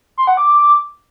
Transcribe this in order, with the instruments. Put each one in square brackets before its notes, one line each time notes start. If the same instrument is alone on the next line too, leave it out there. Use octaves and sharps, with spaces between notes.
[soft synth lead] C6
F#5
D6